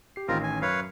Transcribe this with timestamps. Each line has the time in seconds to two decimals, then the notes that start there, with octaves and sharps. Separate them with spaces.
0.16 G4 C7
0.28 A1 D#3 C4 C#4 F4 A#4
0.43 G#5
0.62 F#2 B4 C#5 F5